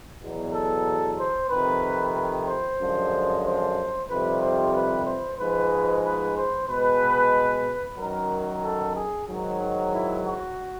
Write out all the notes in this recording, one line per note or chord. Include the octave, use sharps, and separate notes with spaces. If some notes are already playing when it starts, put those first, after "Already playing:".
E2 B2 F#3
A4
C5
F2 C3 D#3 B4
B4
C5
F#2 D3 F3 G#3
C5
F2 C3 D#3 G3 B4
C5
B4
C5
G#2 F3 G#3 B4
B4
C5
B2 G#3 B4
F#2 D#3 F#3 A#4
A4
G#4
G#2 D#3 F#3
E4
F#4